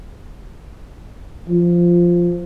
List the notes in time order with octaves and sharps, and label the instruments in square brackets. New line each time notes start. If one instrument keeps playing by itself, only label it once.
[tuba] F3